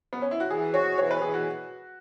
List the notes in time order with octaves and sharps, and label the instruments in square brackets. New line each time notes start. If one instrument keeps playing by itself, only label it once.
[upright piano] B3
C#4
E4
F#4
[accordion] E3 [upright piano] G#4
[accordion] F#4 [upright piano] C#5
[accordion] E3 [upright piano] C#5
[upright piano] B4
[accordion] E3 [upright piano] G#4
[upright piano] F#4